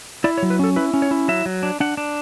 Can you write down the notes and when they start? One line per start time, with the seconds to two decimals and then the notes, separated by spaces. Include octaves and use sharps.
0.24 E4 D5
0.38 C#5
0.42 F#3
0.50 B4
0.59 C#4 A4
0.76 E4 B4
0.94 C#4
1.02 C#5
1.11 E4
1.28 F#3 E5
1.46 F#3
1.63 D4
1.80 D4 F#5
1.97 D4